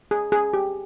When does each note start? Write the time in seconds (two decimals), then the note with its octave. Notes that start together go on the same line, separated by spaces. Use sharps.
0.11 G#4
0.32 G#4
0.53 G4